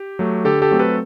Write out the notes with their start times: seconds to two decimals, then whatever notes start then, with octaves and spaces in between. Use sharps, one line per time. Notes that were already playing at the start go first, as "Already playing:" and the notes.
Already playing: G4
0.19 F#3 A3
0.44 D3 G4 A4
0.62 G4 A4
0.71 F#3 A3 C4
0.79 A4 B4